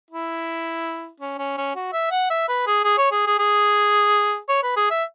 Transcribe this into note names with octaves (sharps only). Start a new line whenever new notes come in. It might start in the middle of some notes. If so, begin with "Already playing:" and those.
E4
C#4
C#4
C#4
F#4
E5
F#5
E5
B4
G#4
G#4
C#5
G#4
G#4
G#4
C#5
B4
G#4
E5